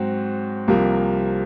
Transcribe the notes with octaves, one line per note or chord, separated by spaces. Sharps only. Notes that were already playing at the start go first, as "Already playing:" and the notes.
Already playing: G#2 F#3 C4 F#4
C2 C3 F3 A#3